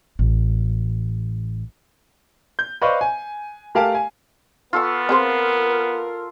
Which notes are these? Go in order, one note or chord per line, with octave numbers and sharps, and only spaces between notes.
A1
G6
B4 C5 D5 D#5 F5 C#6
G#5
A3 G4 A#4 F5 G#5 A5
G#5
B3 F4 A4 C#6
C4 G#4 A#4 C5